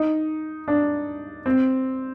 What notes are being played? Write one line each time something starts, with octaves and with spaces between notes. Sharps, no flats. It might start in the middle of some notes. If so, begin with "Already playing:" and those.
Already playing: D#4
D4
C4